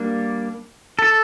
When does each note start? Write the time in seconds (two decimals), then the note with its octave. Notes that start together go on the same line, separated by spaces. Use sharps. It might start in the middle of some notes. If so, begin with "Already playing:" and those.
Already playing: G3 A#3 D4
0.99 A4